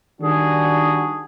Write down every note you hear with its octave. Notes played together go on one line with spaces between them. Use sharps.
D#3 G3 D4 F#4 G#4